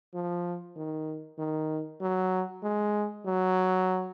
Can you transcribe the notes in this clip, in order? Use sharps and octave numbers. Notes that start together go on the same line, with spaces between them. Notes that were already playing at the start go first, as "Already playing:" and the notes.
F3
D#3
D#3
F#3
G#3
F#3